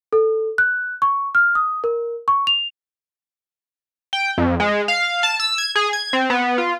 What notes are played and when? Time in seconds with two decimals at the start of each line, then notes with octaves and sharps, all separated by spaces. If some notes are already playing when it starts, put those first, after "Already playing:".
0.13 A4
0.58 F#6
1.02 C#6
1.35 F6
1.55 D#6
1.84 A#4
2.28 C#6
2.47 F7
4.13 G5
4.38 F2
4.60 G#3
4.88 F5
5.23 A5
5.40 E6
5.58 G#6
5.76 G#4
5.93 G#6
6.13 C4
6.30 B3
6.58 F4